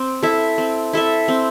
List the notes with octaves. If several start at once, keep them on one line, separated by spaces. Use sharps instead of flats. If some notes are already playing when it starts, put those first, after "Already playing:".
Already playing: C4
E4 A4 E5
C4
E4 A4 E5
C4